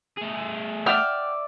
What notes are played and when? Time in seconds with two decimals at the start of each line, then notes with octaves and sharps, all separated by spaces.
0.18 A3 G#4
0.86 D5 E5 F#5 G5 F6